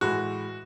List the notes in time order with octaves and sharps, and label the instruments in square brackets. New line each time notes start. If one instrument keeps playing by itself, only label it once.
[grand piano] A2 E3 G#3 F#4